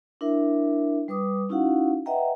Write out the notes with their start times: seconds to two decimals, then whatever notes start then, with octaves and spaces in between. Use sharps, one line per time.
0.21 D4 E4 A#4 E5
1.08 G3 B4 D6 D#6
1.49 C#4 D#4 E4 F#4 F5 F#5
2.06 B4 D#5 E5 F#5 G5 A#5